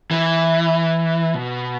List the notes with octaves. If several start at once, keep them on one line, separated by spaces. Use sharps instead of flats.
E3
B2